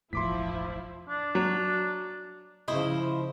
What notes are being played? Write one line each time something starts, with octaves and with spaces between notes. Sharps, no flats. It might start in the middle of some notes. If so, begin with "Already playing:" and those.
E1 A1 A2 F3 E4 C6 D6 B6
D4
F#3
C#3 F3 E4 C5 D#5